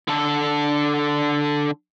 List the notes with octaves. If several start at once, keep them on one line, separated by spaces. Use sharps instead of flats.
D3 A4